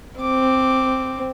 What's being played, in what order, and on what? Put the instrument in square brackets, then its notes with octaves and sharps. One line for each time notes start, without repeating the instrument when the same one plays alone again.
[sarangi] C4 [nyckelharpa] D6